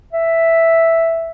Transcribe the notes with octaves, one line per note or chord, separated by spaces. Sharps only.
E5